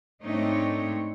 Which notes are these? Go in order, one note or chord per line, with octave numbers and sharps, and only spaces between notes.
G#2 A3 C4 D4 D#4 C#5